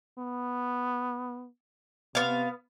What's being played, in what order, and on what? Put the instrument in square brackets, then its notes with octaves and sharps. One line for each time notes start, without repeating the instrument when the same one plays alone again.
[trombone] B3
[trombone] C3 [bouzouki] B3 F5